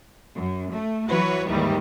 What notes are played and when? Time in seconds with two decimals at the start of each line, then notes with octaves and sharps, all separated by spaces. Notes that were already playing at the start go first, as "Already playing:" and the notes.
0.34 F#2
0.71 A3
1.08 E3 F#3 F#4 B4 C#5
1.47 D#2 G#2 D#3 E3 G3